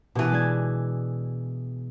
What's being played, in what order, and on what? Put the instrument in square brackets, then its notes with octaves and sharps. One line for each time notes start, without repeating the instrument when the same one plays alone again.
[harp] B2 [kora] E3 G4
[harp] G#3 D4 G#6